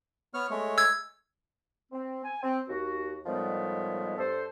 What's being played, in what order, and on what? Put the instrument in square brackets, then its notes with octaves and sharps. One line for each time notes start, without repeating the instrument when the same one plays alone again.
[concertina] B3 C#5 F6
G#3 A3 C#5
[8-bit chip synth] E6 G#6
[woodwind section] C4
G#5
C4
D#2 F#4
A2 D#3 F3 G3 G#3 B3
G2 A4 C5